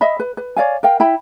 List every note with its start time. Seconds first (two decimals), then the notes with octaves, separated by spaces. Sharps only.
0.01 D#5 E5 B5
0.20 B4
0.37 B4
0.57 C#5 D5 F5 G#5
0.83 A#4 F5 G5
1.00 E4 G5 B5